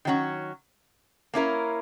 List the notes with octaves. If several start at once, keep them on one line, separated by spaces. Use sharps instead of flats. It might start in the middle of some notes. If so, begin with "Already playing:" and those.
D#3 F#3 C#4 F#4
A#3 C#4 E4 A#4